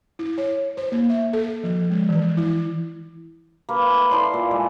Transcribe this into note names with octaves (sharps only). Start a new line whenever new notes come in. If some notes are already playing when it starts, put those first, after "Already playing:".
E4
C#5
C5
A#3
E5
A4
F3
G#3
E3
E4
A#3 B4
A3
E4 A4 D5 C6
A#2
G#3